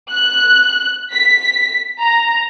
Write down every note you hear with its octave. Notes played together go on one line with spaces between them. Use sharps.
F#6
B6
A#5